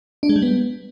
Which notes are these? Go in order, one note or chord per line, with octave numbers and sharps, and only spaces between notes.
D4
G#3
G3
B3